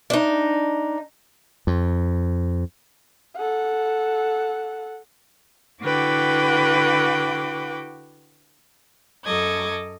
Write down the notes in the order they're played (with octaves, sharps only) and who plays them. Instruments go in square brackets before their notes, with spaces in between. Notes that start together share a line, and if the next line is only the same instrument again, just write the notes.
[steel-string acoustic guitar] D4 D#4
[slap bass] F2
[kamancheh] A4 F#5
[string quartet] D3 E4 F#4 B4 G5 D6
F#2 F#3 A4 D#5 D6 G#6